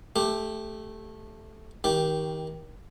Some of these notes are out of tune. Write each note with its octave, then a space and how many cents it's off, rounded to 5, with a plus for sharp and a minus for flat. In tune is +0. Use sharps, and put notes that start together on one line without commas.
A3 -5 G4 +15
D#3 +25 G4 -5